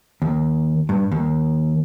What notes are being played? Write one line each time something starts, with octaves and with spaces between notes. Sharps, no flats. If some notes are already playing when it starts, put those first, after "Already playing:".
D#2
G2
D#2